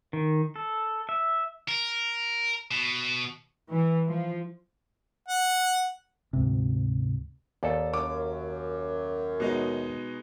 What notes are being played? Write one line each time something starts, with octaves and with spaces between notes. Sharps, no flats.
D#3
A4
E5
A#4
B2
E3
F3
F#5
D2 G#2 C3
D#2 A4 D5
F#2 D6
B2 G#3 D#4